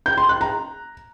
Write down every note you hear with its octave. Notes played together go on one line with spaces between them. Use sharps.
G6
C6
F#6
A#5